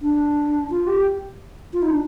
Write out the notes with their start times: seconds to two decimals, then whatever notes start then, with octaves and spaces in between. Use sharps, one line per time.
0.02 D4
0.70 F4
0.87 G4
1.73 F4
1.82 D#4
1.91 D4